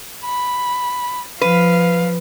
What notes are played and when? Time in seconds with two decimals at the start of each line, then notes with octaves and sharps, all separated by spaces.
0.25 B5
1.41 F3 B4 F5